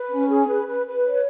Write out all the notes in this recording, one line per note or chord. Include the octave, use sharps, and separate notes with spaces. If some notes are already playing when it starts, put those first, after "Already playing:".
Already playing: B4
C#4
G#4
B4
B4
B4
C#5